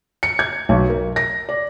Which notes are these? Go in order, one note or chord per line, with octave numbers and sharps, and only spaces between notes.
C#7
G#6
B1
A#4
A#6
D5